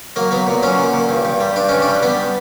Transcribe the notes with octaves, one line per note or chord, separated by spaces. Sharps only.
F#3 A#3
F#3 B3
A#2
F#3 C#4
A#2
A#2
G2
G2
G3
G2 D4
G2 C#4
D4
G3
G3 B3